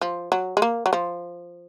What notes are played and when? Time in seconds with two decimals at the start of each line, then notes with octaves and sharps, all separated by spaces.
0.01 F3
0.32 F#3
0.57 G#3
0.62 A#3
0.86 F#3
0.93 F3